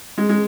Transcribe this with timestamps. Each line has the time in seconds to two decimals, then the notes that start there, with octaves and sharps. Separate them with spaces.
0.18 G#3
0.29 G#3